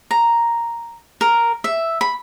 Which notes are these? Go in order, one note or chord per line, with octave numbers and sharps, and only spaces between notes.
A#5
A#4
E5
B5